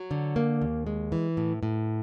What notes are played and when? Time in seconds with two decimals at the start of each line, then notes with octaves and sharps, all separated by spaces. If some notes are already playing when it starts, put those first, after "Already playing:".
Already playing: F#3
0.11 D3
0.36 A#3
0.61 D#2
0.87 G#3
1.12 E3
1.37 A2
1.63 A2